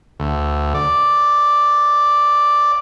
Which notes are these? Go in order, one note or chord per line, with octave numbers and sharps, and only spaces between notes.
D2
D5